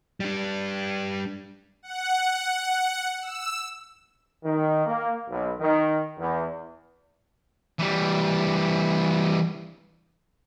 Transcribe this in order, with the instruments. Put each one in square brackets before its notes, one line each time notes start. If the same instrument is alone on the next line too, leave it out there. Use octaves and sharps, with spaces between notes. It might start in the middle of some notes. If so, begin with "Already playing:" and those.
[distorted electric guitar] G3 D4
[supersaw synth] F#5
E6
[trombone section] D#3
A#3
B1
D#3
E2
[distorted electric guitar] E3 G3